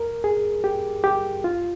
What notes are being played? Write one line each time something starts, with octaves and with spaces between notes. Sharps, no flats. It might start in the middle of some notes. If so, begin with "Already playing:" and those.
Already playing: A#4
G#4
G4
G4
F4